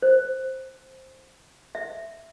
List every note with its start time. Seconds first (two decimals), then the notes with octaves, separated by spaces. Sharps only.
0.02 C5
1.75 E5